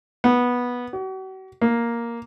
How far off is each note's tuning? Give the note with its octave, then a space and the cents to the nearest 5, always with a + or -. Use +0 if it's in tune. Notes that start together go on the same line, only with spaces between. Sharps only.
B3 -10
F#4 +40
A#3 +5